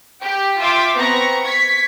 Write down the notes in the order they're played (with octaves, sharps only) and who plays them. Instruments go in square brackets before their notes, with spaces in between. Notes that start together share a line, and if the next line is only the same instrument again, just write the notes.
[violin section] G4 G5
F4 E5 G5 C6 D6
B3 C4 A#5 C#6 A#6
C#6 G#6 B6